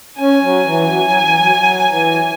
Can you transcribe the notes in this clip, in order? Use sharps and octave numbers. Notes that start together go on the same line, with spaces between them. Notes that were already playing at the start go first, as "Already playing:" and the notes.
C#4 G#5
F#3
E3
F#3 G#5
F#3
E3
F#3
F#3
E3